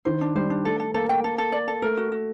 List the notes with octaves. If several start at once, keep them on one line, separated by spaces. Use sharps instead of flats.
D#3 C5
D4
G3 C5
D4
A3 A4
A4
A#3 A4
G5
A4
A4
D5
A4
A3 A#4
F#4
F#4